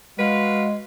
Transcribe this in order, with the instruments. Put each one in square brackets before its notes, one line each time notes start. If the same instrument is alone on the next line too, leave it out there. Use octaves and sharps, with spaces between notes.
[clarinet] G#3 [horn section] F#4 B4 F5